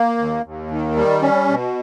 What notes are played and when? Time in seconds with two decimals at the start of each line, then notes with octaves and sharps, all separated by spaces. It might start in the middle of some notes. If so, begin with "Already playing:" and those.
Already playing: A#3
0.18 D#2
0.44 D#2
0.71 D#3
0.96 G3
1.22 C#4
1.49 B2